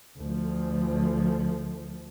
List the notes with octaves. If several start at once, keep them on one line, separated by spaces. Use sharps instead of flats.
D2 F3